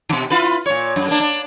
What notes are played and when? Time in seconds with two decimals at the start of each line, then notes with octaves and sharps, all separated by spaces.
0.09 B2 D#3
0.30 E4 F4 B4
0.66 A#2 C#5
0.96 F#2
1.08 A#3 D4
1.20 D4